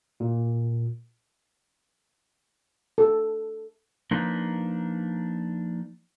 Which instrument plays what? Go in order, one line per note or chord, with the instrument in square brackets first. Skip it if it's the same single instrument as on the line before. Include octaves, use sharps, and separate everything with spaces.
[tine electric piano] A#2
[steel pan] A4
[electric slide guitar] F3 A#3 D4 D#4 B4